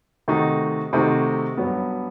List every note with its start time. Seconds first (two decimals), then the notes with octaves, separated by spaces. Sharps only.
0.28 C3 D#3 A3 D#4 F#4
0.93 C3 D#3 A3 D#4 F#4
1.57 G2 F#3 B3